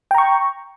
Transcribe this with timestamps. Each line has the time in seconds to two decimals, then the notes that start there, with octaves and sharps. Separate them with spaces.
0.11 G5
0.15 A#5
0.18 C#6